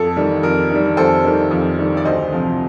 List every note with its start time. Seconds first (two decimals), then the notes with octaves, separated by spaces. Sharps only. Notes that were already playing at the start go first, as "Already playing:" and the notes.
Already playing: F2 A4
0.16 D#3 G3
0.43 F2 A#4
0.71 D#3 G3
0.97 F2 A4 C5
1.24 D#3 G3
1.51 F2
1.78 D#3 G3
1.97 D5
2.05 D2 C5 D#5
2.32 C3 F3